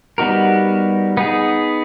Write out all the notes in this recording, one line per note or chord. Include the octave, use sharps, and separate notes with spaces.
G3 B3 D#4 F#4 A#4
B3 D#4 G#4